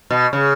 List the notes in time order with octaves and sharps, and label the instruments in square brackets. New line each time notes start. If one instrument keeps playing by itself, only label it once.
[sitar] B2
C#3